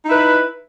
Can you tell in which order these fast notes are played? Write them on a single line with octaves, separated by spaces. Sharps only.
D#4 E4 B4